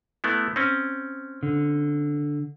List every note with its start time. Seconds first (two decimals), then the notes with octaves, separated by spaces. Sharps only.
0.24 A3 B3 E4
0.56 C4 C#4
1.43 D3